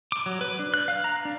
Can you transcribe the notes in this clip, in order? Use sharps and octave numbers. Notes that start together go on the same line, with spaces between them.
D6
F#3
B4
D4
F#6
F5
A#5
D4